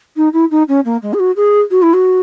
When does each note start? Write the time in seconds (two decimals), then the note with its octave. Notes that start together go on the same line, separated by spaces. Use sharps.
0.16 D#4
0.33 E4
0.51 D#4
0.68 C#4
0.85 A#3
1.02 G#3
1.13 G#4
1.19 F#4
1.36 G#4
1.71 F#4
1.82 E4
1.93 F#4